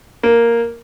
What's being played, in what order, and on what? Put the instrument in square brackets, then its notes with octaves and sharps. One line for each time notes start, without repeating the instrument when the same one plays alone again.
[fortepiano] A#3